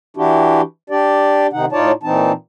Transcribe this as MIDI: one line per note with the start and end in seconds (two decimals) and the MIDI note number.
0.17 0.61 52
0.17 0.61 62
0.17 0.61 64
0.17 0.61 66
0.17 0.61 67
0.90 1.47 62
0.90 1.47 67
0.90 1.47 74
1.53 1.65 48
1.53 1.65 51
1.53 1.65 63
1.53 1.65 78
1.72 1.92 45
1.72 1.92 63
1.72 1.92 65
1.72 1.92 73
1.72 1.92 74
1.72 1.92 81
2.03 2.32 46
2.03 2.32 52
2.03 2.32 60
2.03 2.32 63
2.03 2.32 81